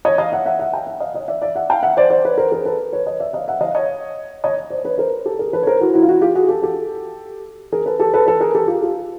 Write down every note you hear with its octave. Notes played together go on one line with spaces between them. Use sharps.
C#5 D#5
D#5 F5
E5 F#5
E5 F#5
E5 F#5
F5 G5
E5 F#5
D#5 F5
C#5 D#5
D5 E5
D5 E5
E5 F#5
F5 G5
E5 F#5
C5 D5
C5 D5
B4 C#5
A#4 C5
G#4 A#4
A4 B4
B4 C#5
C#5 D#5
D5 E5
D#5 F5
E5 F#5
D#5 F5
C#5 D#5
C#5 D#5
C5 D5
B4 C#5
A#4 C5
G4 A4
G#4 A#4
A4 B4
C#5
A#4 C5
E4 F#4
E4 F#4
F4
E4 F#4
F4 G4
F#4 G#4
G4 A4
G4 A4
G#4 A#4
A4 B4
G4 A4
A4 B4
A4 B4
G#4 A#4
G4 A4
F4 G4
F4 G4